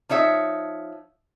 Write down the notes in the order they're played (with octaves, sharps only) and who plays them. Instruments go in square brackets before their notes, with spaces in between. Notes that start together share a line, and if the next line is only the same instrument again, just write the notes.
[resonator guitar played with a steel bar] F3 D#4 C#5 E5